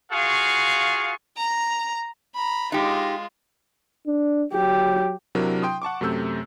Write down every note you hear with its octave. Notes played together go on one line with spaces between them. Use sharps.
F4 F#4 G#4 F5 C#6
A#5
A#5 B5
G#3 D#4 F4 G4
D4
F#3 G4
C3 F#3 D4 E4 A#4
G5 C6 D#6
F#5 A5 C#6 D6
F#2 C3 A3 E6 G6